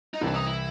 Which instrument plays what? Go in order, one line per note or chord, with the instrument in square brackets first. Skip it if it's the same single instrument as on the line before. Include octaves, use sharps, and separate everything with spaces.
[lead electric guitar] D#4
[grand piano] C2 C3 E3 [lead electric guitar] D4
[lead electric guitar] D#4
E4